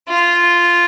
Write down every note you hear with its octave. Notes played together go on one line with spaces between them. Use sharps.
F4